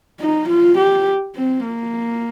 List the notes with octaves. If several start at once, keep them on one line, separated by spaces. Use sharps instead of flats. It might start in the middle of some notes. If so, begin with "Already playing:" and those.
D#4
F4
G4
C4
A#3